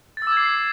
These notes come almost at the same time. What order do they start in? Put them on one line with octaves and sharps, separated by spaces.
A6 E6 D6 G#6 C7